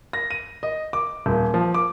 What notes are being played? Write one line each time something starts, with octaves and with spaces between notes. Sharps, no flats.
A#6
D#7
D#5
D6
D#1
F3
D6